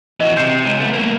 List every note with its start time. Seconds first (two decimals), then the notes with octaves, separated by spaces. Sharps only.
0.20 E3 F#4 D#5
0.37 C3 G6 C7 E7
0.65 C#2
0.80 A3 B3
0.93 A3 A#3